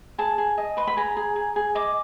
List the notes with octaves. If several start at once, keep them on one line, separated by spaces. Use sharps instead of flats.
G#4 A5
G#4
D#5
B4 C6
B5
G#4 A#5
G#4
G#4
G#4
D#5 D6